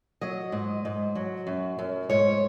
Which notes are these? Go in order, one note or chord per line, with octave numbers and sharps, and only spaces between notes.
F#3 D#5
G#2
G#2
F#3
F#2
F#2
G#2 C#5